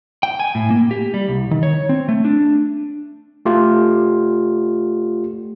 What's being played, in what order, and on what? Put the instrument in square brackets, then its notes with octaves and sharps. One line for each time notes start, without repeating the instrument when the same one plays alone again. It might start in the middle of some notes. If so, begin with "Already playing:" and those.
[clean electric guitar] G5
G#5
A2
A#3
G4
G3
C2
D#3
C#5
C4
A3
D4
[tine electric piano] A3 F4 G4